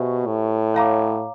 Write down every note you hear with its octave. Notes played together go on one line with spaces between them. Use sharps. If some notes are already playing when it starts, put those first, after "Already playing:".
Already playing: B2 G4 C5 E5 G#5 C#6
A2
C#5 F5 A#5 D6